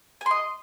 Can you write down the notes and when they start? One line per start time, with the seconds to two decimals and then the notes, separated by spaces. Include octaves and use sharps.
0.21 G#5
0.26 C6
0.31 D#5